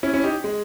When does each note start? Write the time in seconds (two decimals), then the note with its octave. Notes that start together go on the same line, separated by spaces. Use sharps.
0.03 C#4 E4
0.14 C#4 E4
0.23 D#4 G4
0.44 G#3